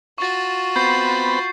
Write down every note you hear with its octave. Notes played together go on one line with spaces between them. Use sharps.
F4 F#4 C#6 A6
B3 C4 B5 G6 C7